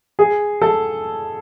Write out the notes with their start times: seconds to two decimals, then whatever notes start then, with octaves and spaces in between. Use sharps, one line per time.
0.19 G#4
0.62 A4